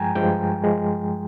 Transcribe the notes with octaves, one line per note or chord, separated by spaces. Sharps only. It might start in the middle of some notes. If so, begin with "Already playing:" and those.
Already playing: G2 F3 G#3 G5 G#5 A#5
G2 F3 G#3 G5
F3 G#3